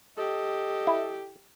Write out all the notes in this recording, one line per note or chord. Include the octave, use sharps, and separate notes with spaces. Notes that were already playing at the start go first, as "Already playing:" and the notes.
G4 A4 D#5
E4